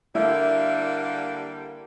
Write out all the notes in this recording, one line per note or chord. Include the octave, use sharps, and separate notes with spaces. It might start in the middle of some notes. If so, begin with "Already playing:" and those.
D3 G3 A#3 E4